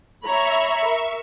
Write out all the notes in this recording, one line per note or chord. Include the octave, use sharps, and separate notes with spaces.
C#5 E5 A#5 B5 C#6
A#4